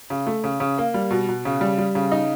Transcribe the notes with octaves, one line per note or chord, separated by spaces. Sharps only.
C#3
A3
C#3
C#3
A#3
G3
B2
B2
C#3
G3
G3
C#3
D#4